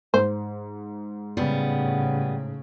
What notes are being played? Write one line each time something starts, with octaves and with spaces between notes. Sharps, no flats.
G#2 C5
A2 C#3 G3 B3